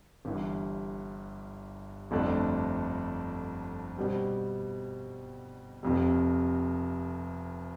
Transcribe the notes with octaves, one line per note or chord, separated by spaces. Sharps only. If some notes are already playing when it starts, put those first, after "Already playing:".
G1 G2 E3
G1 F2 D3 A3 D4
B2 G3 C4 G4
F1 F2 C3